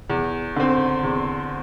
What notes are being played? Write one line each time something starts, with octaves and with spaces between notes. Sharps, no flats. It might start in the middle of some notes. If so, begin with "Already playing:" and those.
E2
D3 C4
E2